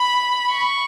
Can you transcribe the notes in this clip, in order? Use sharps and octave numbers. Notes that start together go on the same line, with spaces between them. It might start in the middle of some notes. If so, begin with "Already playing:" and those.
Already playing: B5
C#6